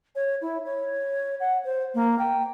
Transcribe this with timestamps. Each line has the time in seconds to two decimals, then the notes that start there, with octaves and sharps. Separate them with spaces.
0.15 C#5
0.41 E4
0.65 C#5
1.40 F#5
1.64 C5
1.94 A#3
2.19 G5